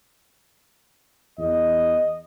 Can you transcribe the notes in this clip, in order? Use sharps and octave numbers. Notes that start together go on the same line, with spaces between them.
E2 D#5